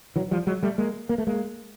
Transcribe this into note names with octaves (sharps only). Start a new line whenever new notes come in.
E3 F#3
F3 G3
F#3 G#3
G3 A3
G#3 A#3
A#3
A3
G#3 A#3